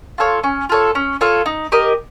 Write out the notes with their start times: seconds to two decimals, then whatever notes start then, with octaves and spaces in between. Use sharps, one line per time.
0.18 F4 A4 C#5
0.44 C#4
0.69 F4 A4 C#5
0.95 C#4
1.21 F4 A4 C#5
1.46 D#4
1.72 G4 A#4 D#5